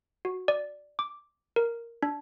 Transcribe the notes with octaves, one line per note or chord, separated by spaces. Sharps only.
F#4
D5
D6
A#4
D4